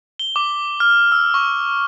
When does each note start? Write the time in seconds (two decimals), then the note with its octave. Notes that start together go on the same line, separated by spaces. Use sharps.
0.19 G7
0.36 D6
0.80 F6
1.12 E6
1.34 C#6